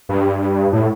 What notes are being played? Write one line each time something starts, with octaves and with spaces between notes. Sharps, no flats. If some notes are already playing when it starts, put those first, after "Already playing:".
G2
A2